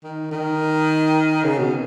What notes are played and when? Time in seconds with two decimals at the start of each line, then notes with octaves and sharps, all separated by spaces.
0.04 D#3
0.31 D#3
1.44 C#3
1.58 B2